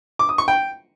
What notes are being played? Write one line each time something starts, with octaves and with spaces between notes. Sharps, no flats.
D6
D#6
C#6
G5